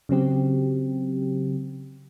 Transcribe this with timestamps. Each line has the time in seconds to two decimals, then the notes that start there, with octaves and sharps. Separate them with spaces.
0.09 C#3 F#3 C4 G4